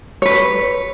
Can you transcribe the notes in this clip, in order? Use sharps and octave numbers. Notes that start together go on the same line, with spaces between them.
B4 C#5